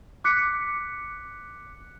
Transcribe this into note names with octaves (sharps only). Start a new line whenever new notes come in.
D6 F#6 B6 C#7